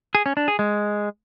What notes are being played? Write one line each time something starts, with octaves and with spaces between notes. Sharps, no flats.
G#4
C#4
D4
G#4
G#3